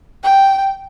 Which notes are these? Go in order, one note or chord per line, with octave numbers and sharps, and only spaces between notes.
G5